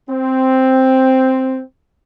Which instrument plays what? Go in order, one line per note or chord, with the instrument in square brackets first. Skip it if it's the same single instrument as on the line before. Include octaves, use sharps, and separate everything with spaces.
[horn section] C4